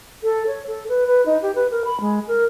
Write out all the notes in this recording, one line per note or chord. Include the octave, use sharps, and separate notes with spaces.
A4
C#5
A4
B4
B4
D#4
G4
B4
A#4
B5
G#3
A#4